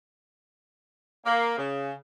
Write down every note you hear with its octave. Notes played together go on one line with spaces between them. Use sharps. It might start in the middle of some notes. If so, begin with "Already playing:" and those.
A#3
C#3